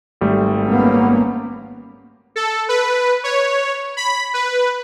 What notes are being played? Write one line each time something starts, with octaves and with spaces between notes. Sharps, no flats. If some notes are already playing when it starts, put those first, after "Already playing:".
G#1 G3 A3
A#3 B3 C#4
A4
B4
C#5
B5
B4